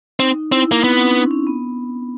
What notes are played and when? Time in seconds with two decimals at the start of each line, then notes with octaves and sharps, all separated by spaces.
0.20 C4 D#4
0.52 C4 E4
0.72 A#3
0.83 B3 C4
0.99 C#4
1.15 D4
1.31 C#4
1.47 B3